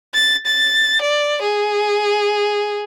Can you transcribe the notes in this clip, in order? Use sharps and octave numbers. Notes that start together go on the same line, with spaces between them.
A6
A6
D5
G#4